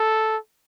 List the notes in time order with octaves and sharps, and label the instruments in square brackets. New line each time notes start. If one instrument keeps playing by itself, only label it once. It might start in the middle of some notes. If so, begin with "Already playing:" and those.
Already playing: [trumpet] A4